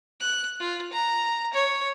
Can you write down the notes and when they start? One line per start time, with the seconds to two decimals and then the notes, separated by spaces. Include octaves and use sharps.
0.20 F#6
0.60 F4
0.92 A#5
1.54 C#5